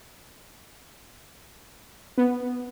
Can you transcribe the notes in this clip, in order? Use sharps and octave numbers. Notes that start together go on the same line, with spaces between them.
B3